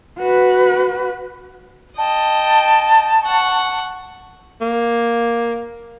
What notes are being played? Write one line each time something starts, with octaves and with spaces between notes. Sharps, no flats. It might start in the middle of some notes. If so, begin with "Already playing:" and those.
F#4 B4
D#5 G5 A5
F#5 C#6
A#3